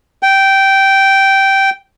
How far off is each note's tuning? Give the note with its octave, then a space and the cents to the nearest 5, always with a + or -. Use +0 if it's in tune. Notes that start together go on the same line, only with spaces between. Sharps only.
G5 -10